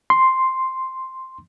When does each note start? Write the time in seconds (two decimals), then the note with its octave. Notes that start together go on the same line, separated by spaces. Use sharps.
0.10 C6